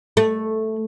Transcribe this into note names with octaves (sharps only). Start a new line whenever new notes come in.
A3